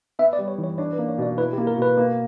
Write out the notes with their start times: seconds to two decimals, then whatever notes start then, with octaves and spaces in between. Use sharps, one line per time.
0.19 B3 E5
0.33 D5
0.39 G3
0.48 C#5
0.58 E3
0.64 C#5
0.78 D4 C#5
0.93 B4
0.98 A#3
1.09 C#5
1.18 B2 D5
1.38 E4 B4
1.53 G4
1.58 A#3
1.67 A#4
1.78 B2 B4
1.97 A#3